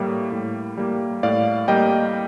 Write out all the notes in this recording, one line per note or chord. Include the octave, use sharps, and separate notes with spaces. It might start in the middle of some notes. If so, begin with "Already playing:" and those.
Already playing: A2 G3 A#3
A2
G3 A#3
A2 D5 F5
G3 A#3 D#5 G5